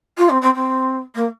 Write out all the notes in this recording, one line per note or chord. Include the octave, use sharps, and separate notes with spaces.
F4
C4
C4
C4
A#3